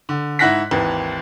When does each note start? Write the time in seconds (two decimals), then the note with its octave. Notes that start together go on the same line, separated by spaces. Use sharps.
0.09 D3
0.39 G#2 E4 F#5 F#6 A#6 B6
0.71 G#1 D#2 E3